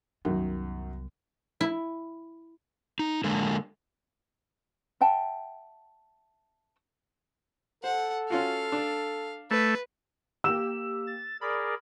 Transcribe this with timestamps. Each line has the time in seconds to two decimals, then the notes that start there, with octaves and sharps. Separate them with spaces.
0.25 C2 F#2 D#3 F#3 B3
1.61 E4
2.99 D#4
3.24 D3 G#3 A#3 A4
5.01 E5 F#5 G5 A5
7.84 A4 C5 F#5
8.30 C#4 F4 F#4 F5
8.72 D4
9.51 A3 B4
10.44 A#3 G4 E6 E7
11.07 A6
11.41 G#4 A#4 D5 B5